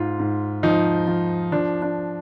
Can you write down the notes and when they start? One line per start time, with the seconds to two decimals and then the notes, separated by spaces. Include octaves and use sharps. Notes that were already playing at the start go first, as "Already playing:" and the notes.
Already playing: G#2 F4
0.19 G#2
0.63 F3 D#4
1.07 F3
1.52 F3 D4
1.82 D4